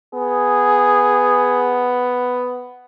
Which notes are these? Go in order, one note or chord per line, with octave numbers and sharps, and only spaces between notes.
B3 G#4